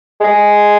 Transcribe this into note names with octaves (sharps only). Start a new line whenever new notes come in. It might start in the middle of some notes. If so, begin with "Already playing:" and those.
G#3